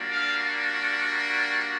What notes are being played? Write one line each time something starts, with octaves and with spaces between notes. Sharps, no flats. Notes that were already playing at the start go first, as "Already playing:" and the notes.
Already playing: G3 A#3 D4 F#4
F5